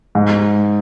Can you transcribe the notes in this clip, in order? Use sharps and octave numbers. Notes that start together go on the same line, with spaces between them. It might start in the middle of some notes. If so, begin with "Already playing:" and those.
G#2